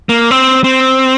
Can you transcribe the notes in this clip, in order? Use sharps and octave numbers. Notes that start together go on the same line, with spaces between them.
A#3
C4
C4